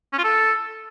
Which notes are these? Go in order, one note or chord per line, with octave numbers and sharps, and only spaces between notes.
C#4
F4
A4